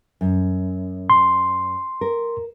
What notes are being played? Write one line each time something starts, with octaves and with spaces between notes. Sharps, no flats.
F#2
C6
A#4